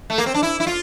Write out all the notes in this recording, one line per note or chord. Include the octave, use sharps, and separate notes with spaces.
A3
A#3
C4
D4
E4
E4
F4